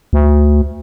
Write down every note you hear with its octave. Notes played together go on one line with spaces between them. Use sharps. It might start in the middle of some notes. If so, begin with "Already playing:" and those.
D2